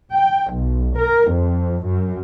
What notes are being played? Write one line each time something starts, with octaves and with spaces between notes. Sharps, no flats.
G5
B1
A#4
F2
F#2